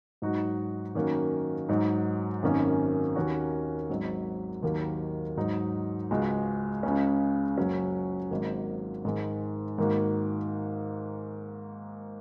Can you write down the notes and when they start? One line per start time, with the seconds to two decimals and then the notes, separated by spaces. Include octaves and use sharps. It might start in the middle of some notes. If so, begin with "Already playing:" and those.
0.22 G#2 F#3 D#4 F#4
0.95 F#2 D#3 A#3 C#4 F#4
1.69 G#2 F#3 D#4
2.43 G#1 F#2 D#3 A#3 C#4
3.15 D#2 D#3 A#3 C#4 F#4
3.90 G#1 G#2 F#3
4.63 D#2 D#3 F#3 A#3
5.37 G#2 F#3 D#4
6.11 C#2 C#3 G#3 F#4
6.83 C#2 C#3 G#3 C#4
7.58 F#1 F#2 F#3 C#4
8.31 G#1 G#2 F#3 A#3
9.05 G#2 D#3 G#3
9.78 G#2 D#3 A#3 F#4